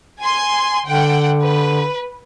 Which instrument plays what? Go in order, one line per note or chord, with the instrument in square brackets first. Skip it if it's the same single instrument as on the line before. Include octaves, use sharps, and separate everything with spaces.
[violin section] G#5 C6
[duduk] D3 [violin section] F#5 G5
[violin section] B4